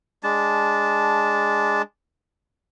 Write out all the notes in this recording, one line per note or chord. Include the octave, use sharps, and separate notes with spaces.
G#3 D4 A5